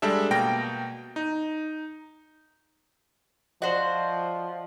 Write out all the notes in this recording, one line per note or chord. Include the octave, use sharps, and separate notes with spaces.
G3 G#3 D4 A4 E5
B2 A#3 G5 A#6 D7
D#4
F3 F#4 C5 D5 D#5 F#7